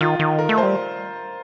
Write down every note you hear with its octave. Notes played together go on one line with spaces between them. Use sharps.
D#3 F4
D#3
A#4
A3
C5
G3